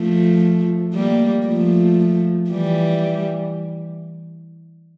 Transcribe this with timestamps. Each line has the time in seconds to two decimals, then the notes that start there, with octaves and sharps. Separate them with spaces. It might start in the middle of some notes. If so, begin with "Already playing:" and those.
Already playing: F3 A3
0.94 G3 A#3
1.46 F3 A3
2.51 E3 G3